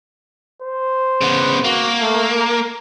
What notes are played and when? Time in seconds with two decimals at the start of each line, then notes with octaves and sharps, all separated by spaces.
0.62 C5
1.21 C#3 B3
1.64 A#3 F#4
2.01 A3
2.40 A#5